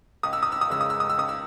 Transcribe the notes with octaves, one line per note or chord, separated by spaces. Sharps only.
C#2 D#6
E6
D#6
E6
D#6
C#3 G#3 E6
D#6
E6
D#6
E6
C#2 D#6
E6